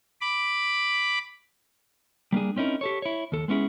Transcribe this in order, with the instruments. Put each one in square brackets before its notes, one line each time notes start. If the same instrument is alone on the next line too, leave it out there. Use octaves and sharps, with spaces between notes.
[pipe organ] B5 D6
[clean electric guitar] G3 A#3 D4 G#4
C4 C#4 D#4 E4 A#4
G4 A4 C#5
E4 C#5
D#2 A4
G#3 B3 C#4 E4 G#4